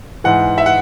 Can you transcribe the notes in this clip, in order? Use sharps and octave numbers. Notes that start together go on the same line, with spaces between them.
G#2 E3 F#5
E5
F#5